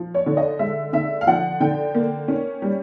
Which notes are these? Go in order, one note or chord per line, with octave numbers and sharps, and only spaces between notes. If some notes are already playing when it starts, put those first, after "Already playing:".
Already playing: F3
C#5
D3
D#5
G#3 E5
D3 E5
F5
F3 F#5
D3 G5
A#3
C#4
G3